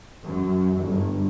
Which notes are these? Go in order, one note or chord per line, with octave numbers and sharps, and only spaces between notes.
F#2
G1